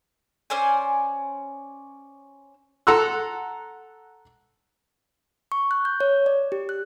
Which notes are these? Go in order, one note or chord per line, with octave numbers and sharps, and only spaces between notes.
C#4 C5 D5 G#5
A4 F#5 A#5 C6 E6 F#6
C#6
F#6
G6
C#5
D5
G4
F#6